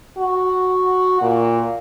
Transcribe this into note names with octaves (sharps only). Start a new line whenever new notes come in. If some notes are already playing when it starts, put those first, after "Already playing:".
F#4
A#2